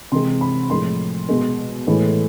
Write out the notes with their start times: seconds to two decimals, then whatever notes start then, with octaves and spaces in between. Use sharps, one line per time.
0.12 C3 E3 G#3 C6
0.41 B5
0.70 A2 F3 G#3 C6
1.29 B2 G#3
1.87 A2 E3 G#3